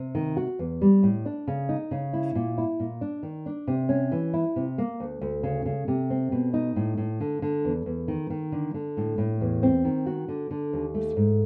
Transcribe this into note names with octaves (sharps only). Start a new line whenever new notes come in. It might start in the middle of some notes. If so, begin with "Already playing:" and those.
Already playing: C3
D#3
F#4
E2
G3
A2
D4
C#3
D#4
C#3
E4
A#2
E4
A#2
D4
D#3
D4
C3
C#4
E3
E4
C3
A#3
D2
D2
C#3
C#3
C3
C4
B2
D#4
A2
A2
D3
D3
E2
E2
D#3
D#3
D3
D3
A2
A2
E2
C4
D#3
F#4
D3
D3
D#2
A3
G#2